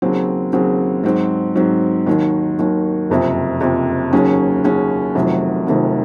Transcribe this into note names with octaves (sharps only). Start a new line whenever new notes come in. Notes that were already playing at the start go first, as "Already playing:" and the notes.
D#2 C#3 F#3 C4
D#2 C#3 F#3 C4
G#2 F#3 C4
G#2 F#3 C4
D#2 D#3 F#3
D#2 D#3 F#3
F#1 F2 C3
F#1 F2 C3
D#2 C#3 F#3 C#4
D#2 C#3 F#3 C#4
F1 F2 C3 D#3 F#3
F1 F2 C3 D#3 F#3